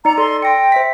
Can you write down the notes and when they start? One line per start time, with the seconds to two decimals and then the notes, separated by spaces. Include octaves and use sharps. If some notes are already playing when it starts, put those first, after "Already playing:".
0.05 D#4 D5 A#5 C#7
0.18 A4 D5 C6
0.42 G5 C6 A#6 C#7
0.72 C5 E5 B6